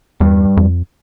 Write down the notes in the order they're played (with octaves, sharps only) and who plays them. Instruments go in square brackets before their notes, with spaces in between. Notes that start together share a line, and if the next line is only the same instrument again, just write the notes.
[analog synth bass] E2 [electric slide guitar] G2
[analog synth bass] F2